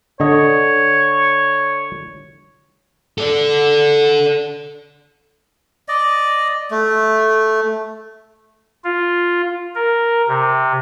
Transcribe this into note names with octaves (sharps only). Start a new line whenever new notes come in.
D3 C#5 D#5
A4 D5
D5 D#5
A3
F4
A#4
C3